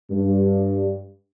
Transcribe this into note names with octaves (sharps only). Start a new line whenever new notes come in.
G2